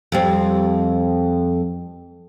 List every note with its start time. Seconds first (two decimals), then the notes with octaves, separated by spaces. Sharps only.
0.12 F2 G3 C4